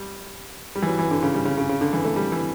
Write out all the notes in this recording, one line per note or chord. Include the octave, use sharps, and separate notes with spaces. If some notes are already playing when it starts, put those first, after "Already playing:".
Already playing: G3
G3
E3
F#3
E3
D3
C#3
G3
C#3
C#3
C#3
D3
E3
A3
G3
E3